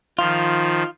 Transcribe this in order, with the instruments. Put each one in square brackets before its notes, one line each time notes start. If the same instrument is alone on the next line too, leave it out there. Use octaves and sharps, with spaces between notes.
[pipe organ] D#3 F3 [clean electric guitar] F4